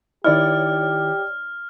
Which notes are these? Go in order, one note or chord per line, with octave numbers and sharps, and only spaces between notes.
D#3 D#4 E4 G4 C#5 D5 F6